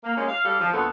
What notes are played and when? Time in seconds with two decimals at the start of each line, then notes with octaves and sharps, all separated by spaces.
0.03 A#3
0.16 G#3 A#3 C#4 G4
0.28 F5
0.43 G3 G4 A4 F5
0.59 F3
0.72 D2 A#2 B3 A4